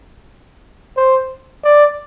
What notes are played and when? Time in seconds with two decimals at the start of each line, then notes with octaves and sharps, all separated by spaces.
0.97 C5
1.64 D5